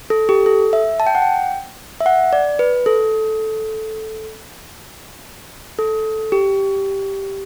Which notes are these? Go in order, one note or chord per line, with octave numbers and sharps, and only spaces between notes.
A4
G4
A4
E5
A5
G5
F#5
G5
E5
F#5
D5
B4
A4
A4
G4